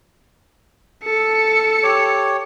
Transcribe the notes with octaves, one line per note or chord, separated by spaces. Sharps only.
A4 C#7
G4 C#5